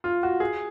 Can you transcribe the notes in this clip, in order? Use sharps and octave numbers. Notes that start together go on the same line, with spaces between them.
F4
F#4
G#4